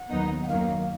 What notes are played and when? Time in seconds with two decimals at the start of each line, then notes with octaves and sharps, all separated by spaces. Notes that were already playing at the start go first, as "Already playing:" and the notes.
Already playing: F#5
0.10 D#2 D#3 F#3 B3 D#4
0.43 F#5
0.48 F#2 D#3 F#3 A#3 F5